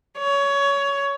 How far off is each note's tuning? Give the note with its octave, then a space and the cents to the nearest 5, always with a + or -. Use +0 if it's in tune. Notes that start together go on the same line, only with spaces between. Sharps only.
C#5 +20